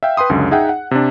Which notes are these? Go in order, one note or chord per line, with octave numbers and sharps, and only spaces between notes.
E5 F5 G5
B4 G5 C6 D#6
C#2 F#2 D3
D#4 G#4 E5 F#5 G5
F#5
C3 D4